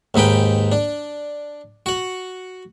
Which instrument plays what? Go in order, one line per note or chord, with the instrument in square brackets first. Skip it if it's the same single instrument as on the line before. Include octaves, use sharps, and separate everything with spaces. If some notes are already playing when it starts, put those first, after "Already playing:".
[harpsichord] D#2 G#2 D#4 B4 G5
D4
F#4 F#5